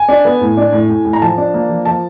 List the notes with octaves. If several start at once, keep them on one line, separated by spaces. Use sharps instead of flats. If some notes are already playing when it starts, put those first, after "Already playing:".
Already playing: G#5
D4
B3
A2
D4
A2
A2
A2
A#5
F3 A5
D4
A#3
F3
F3 A5